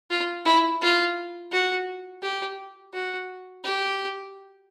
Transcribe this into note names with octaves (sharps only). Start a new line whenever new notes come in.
F4
E4
F4
F#4
G4
F#4
G4